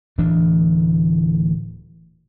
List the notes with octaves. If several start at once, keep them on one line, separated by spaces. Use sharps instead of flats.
D1 D2 E3 D4